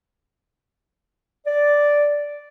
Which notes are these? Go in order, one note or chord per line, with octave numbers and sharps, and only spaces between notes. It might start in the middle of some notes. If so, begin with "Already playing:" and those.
D5